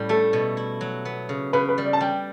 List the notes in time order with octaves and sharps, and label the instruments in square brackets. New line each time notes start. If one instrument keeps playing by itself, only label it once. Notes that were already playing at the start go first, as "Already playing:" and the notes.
Already playing: [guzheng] A2 G3 C#4
[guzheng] A3 [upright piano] A4
[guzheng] B2
E4
F#3
B3
C#3
[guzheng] C#3 [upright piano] B4
[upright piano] B4
[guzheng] G3
[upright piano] D5
A5
[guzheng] G3 [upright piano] G5